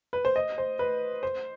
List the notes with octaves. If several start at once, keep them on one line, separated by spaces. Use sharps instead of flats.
B4
C5
D#5
C5
B4
C5